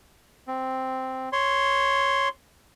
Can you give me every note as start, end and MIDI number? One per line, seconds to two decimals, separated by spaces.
0.47 1.29 60
1.33 2.28 73
1.33 2.28 84